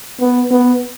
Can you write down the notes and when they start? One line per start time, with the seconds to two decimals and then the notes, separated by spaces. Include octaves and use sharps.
0.20 B3
0.51 B3